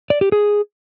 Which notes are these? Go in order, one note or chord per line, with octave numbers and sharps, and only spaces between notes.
D5
G4
G#4